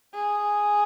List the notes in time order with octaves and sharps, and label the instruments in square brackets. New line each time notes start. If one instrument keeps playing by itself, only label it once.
[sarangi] G#4